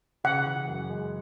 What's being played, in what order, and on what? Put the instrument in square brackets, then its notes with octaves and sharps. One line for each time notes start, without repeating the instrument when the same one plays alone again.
[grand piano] C#3 [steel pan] F#5
[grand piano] E3
F#2
G#3